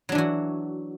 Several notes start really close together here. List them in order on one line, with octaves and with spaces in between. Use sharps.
F#3 D4 E3 F#4